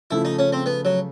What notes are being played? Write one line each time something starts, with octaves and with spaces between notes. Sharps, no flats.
C#3 F3 A3 E4
D#4
C#4
C4
B3
F#3